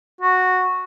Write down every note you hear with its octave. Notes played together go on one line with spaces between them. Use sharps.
F#4